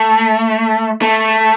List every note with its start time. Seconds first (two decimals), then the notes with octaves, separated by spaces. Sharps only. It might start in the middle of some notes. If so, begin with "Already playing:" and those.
Already playing: A3
1.02 A3